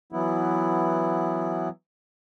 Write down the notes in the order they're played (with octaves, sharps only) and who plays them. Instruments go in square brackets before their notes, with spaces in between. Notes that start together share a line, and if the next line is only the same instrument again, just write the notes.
[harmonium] E3 F#3 B3 E4